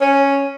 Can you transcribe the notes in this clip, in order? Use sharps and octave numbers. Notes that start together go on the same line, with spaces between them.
C#4